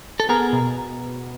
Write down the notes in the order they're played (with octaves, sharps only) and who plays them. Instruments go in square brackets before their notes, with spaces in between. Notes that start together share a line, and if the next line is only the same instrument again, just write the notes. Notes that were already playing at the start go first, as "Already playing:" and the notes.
[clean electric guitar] A4
[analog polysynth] B3 [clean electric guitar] G#4 A#4
[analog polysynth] B2